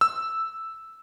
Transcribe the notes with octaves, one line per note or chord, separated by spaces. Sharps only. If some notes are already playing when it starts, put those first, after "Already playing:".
E6